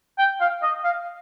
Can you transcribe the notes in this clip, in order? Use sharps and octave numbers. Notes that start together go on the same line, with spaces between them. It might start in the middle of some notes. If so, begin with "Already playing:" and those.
G5
F5
D#5
F5